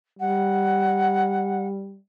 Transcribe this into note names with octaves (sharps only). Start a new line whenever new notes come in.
G3 F#5